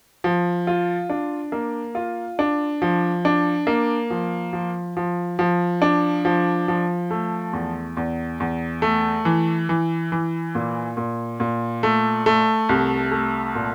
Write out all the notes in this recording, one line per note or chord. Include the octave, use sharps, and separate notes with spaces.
F3
F4
D4
A#3
F4
D4
F3
D4
A#3
F3
F3
F3
F3
D4
F3
F3
A3
E2
E2
E2
A3
E3
E3
E3
A#2
A#2
A#2
A3
A3
C2
A3
A#2